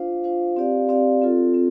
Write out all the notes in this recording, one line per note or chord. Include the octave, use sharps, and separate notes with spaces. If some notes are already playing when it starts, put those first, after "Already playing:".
Already playing: D4 F4 C5 F5
D4 F4 C5 F5
C4 G4 D5 F5
C4 G4 D5 F5
C4 F4 A4
C4